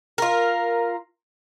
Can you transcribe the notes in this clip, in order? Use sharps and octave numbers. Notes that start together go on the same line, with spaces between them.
F4 A#4